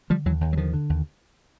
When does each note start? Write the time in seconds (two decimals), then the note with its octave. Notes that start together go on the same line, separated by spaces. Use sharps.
0.10 D3 F3 G3
0.26 D#2 E3 F#3
0.41 D#2
0.53 F#3
0.57 D3 D#3 F3
0.74 D3
0.90 D#2